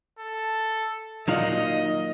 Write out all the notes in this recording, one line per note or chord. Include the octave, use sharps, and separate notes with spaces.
A4
A#2 D#3 F#3 D#4 D#5 F5 F#5